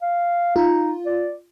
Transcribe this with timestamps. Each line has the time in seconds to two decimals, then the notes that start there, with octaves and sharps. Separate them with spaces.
0.02 F5
0.56 D#4 F4
1.06 D5